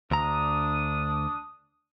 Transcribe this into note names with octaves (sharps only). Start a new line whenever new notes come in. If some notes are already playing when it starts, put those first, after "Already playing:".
D2 D4 A#5 D#6